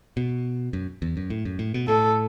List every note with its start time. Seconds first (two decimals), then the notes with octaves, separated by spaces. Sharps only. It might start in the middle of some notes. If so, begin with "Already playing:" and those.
0.17 B2
0.73 F#2
1.02 E2
1.17 F#2
1.30 A2
1.45 F#2
1.59 A2
1.74 B2
1.88 A2 A4